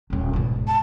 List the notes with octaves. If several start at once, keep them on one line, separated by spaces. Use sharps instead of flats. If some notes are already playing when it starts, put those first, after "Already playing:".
D#1 B1
G#2 B2
A5